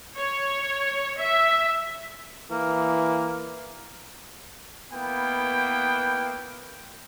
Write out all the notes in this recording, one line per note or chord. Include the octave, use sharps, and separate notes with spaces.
C#5
E5
E3 A#3
A#3 B3 E4 B4 G5